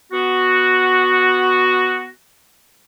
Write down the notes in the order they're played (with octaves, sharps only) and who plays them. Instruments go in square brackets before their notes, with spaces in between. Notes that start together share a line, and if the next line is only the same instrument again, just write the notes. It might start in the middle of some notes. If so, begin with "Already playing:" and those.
[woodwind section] B3 F#4